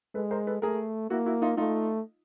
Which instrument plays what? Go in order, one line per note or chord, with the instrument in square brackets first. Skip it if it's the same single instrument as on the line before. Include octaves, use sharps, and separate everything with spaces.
[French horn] G#3 [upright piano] A4 B4
[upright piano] A#4 C5
A4 B4
[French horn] A3 [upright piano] G#4 A#4
[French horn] A#3 [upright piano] E4 F#4
[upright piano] E4 F#4
D#4 F4
[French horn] A3 [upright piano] D#4 F4